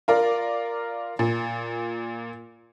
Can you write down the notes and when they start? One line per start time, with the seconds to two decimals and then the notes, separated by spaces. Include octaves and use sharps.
0.08 F4 A#4 D5
1.19 A#2